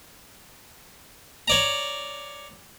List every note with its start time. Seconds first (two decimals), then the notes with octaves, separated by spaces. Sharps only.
1.48 C#5 D5 A#5